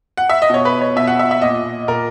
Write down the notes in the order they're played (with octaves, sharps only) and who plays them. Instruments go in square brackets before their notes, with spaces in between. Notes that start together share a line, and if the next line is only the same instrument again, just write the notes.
[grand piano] F#5
E5
D#5
B2 C#5
B4
C#5
B2 E5
F#5
E5
E5
A#2 D#5
A#2 A#4